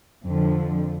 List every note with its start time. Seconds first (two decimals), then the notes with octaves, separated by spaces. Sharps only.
0.25 F2 D3 F3